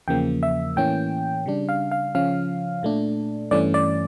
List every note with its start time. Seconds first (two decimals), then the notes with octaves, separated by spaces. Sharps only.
0.08 E2 C#3 F3 A#3 G5
0.43 E5
0.76 A2 E3 A#3 C#4 G5
1.46 C#3 G3 D4
1.69 F5
1.92 F5
2.15 C#3 F3 C#4 F5
2.83 A#2 A3 D4
3.51 G2 E3 A3 C#4 D5
3.74 D5